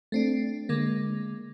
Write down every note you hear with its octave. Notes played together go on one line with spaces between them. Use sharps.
A3 C4 D4
D3 G#3 A#3